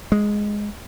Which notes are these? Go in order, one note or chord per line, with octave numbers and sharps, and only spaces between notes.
G#3